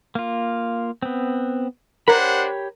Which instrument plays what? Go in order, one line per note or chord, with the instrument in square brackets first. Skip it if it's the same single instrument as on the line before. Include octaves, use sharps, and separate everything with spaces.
[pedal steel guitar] A#3 F4
B3 C4
[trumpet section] D4 C5 F#5 [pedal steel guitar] G4 C#5 B5 [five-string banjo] A#4